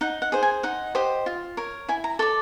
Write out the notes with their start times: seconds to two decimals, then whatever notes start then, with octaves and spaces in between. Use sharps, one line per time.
0.01 D#4 F#5
0.22 F#5
0.32 G#4 C5
0.43 G#5
0.63 D#4 F#5
0.95 G4 C5 D#5
1.26 F4
1.57 A#4 C#5
1.88 E4 G#5
2.04 A#5
2.19 A4 C#6
2.22 D5